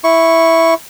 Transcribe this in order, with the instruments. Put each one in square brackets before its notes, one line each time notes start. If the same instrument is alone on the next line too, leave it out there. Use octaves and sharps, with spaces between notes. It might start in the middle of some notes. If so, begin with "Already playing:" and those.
[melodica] E4 C#6